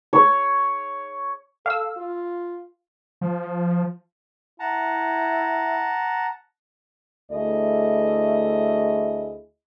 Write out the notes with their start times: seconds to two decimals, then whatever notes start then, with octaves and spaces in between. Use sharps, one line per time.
0.13 C#5
1.66 A4 F5 E6
1.97 F4
3.21 F3
4.60 E4 F#5 A5 A#5
7.30 D2 A3 E4 G#4 D#5